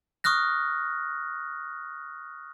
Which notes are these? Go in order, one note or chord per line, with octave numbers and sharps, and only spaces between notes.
C#6 D#6 F6 F#6 A#6